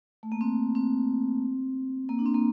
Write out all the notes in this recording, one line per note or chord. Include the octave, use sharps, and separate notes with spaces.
A3
A#3
C4
C4
A#3
D4
C4
A#3